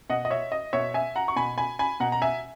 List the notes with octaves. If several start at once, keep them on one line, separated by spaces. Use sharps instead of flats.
B2 D#5 F#5
D#5
C#5 E5
D#5
B2 C#5 E5
E5 G#5
F#5 A#5
C#6
B2 G#5 B5
G#5 B5
G#5 B5
B2 F#5 A#5
A#5
E5 G#5